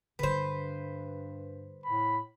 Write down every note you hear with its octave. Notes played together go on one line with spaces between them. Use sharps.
G2 D3 G3 B4 C5
A2 B5